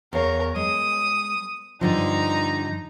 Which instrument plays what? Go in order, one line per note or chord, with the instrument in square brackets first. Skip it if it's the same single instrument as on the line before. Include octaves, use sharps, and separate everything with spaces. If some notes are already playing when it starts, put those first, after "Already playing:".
[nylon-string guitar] E2 F5 [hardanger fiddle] A#4 C#5
[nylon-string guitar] G#3 [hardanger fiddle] D#6
[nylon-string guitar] G2 D3 F3 [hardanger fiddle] D#4 A#5